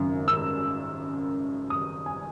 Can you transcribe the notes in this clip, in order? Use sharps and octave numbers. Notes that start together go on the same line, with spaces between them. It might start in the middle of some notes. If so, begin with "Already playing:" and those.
Already playing: G#1 F#2 C#3
E6
D#6
G#5